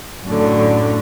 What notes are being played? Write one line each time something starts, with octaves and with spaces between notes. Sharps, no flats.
F#2 A2 D3